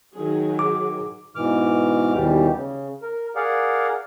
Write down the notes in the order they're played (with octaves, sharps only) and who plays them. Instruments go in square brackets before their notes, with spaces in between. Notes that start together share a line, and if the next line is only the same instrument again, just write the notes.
[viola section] D#3 F#3 G#4
[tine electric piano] D6
[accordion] G#2 B2 E3 D6 F6
D#2 B2 E3 G3 G4
C#3
A#4
G#4 A#4 D5 F5 F#5